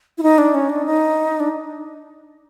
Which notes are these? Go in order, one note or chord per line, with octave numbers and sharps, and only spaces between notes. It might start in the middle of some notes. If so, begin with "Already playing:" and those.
E4
D#4
D4
C#4
D4
D#4
D4